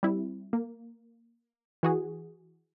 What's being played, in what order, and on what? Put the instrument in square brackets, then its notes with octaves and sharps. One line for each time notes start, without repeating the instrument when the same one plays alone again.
[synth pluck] G3 C4 E4
A#3
E3 F#4 G#4